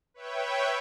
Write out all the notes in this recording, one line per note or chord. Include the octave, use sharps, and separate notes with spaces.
B4 C#5 E5 G5